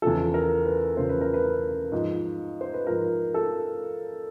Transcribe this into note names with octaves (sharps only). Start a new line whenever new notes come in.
E2 C#3 F3 A4
A#4
B4
E2 C#3 F3 C5
B4
A#4
B4
G#2 F3
C5
B4
G#2 F3 A#4
A4